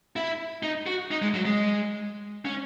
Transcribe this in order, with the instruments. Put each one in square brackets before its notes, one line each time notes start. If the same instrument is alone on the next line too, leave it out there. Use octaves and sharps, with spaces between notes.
[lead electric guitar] E4
D#4
F#4
D#4
G#3
F#3
G#3
C#4